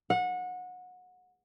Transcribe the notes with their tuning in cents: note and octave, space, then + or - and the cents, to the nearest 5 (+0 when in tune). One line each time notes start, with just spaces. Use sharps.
F#5 -25